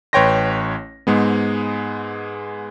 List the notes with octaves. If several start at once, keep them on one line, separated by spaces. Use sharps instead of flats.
A1 B4 C#5 G5 C6 A#6
G#2 G#3 B3